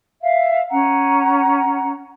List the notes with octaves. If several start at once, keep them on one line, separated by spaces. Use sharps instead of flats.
E5 F5
C#4 F#5 A#5